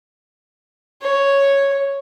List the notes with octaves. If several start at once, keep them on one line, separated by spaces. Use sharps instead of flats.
C#5